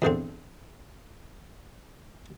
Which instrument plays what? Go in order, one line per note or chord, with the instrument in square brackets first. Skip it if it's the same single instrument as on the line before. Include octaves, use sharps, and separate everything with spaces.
[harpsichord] E2 G2 D3 C4